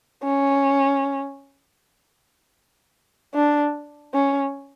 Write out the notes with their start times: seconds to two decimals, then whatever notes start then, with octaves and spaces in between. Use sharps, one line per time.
0.23 C#4
3.35 D4
4.14 C#4